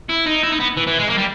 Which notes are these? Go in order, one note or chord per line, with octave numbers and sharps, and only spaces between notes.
E4
D#4
E4
D#4
B3
E3
E3
G#3
A#3
G3